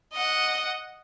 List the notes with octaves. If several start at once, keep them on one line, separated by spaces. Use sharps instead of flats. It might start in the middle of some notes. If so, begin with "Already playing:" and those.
D#5 F#5